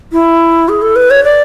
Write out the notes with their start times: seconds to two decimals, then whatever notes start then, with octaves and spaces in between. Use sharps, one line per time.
0.13 E4
0.69 G#4
0.82 A4
0.96 B4
1.11 C#5
1.24 D5